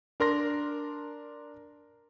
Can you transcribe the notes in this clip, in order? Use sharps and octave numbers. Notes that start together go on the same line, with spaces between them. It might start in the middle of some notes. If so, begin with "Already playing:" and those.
D4 A#4 C6 A#6